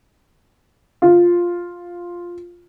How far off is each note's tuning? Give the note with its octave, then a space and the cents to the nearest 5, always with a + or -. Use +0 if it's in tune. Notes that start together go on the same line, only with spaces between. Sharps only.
F4 +5